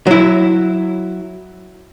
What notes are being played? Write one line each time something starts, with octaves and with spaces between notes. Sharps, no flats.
F#3 E4